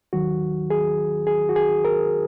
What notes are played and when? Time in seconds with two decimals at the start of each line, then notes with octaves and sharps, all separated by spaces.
0.13 D#2 D#3 F#3 F#4
0.70 G#4
1.27 G#4
1.49 F#4
1.56 G#4
1.85 A#4